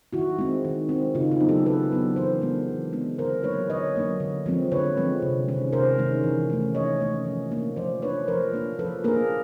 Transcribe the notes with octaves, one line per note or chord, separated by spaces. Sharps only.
D#3 E4 F#4
G#3 C4
D#3
G#3 C4
C#3 D#4 F4
D#4
F#3 B3 D4
G4 A4
C#3 A4 B4
F#3 B3 D4
E3 A#4 C5
G#3 B3 D4
E3
G#3 B3 D4
D3 A#4 C5
F#3 A#3 D4 B4 C#5
D3 C#5 D#5
F#3 A#3 D4
D3
F3 G#3 C4
D3 B4 C#5
F3 G#3 C4
C3
D#3 G#3 C#4
C3 A#4 C5
D#3 G#3 C#4
E3
A3 C#4
E3 C#5 D#5
A3 C#4
F3
A#3 D4
F3 C5 D5
A#3 D4 B4 C#5
F3 A#4 C5
A#3 D4
F3 A4 B4
A#3 D4 G#4 A#4